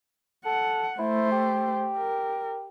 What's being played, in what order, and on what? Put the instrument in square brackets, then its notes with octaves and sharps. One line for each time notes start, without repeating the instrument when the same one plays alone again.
[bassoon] A4 [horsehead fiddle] F#5
[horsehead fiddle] A3 C5 [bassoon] E4
[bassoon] G4
[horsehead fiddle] A#4